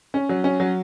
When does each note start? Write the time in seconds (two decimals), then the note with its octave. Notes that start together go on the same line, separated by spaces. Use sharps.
0.14 C#4
0.29 F#3
0.44 C#4
0.60 F#3